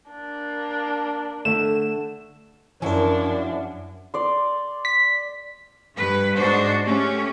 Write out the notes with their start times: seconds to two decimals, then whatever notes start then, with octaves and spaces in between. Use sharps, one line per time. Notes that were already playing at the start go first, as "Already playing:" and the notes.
0.10 A#3 D4
1.45 D3 A3 E7
2.82 F#2 F3 D4 E4 F#4 A#4 G#5
4.14 D5 C6
4.85 B6
5.97 G2 B4
6.35 G#2 D4 F#4 C5
6.85 A3 C#4 G4